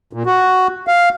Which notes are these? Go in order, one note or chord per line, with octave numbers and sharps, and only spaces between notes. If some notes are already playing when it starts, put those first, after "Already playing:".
A#2
F#4
F5